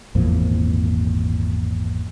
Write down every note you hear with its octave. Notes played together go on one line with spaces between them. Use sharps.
G#1 E2 A#2 F3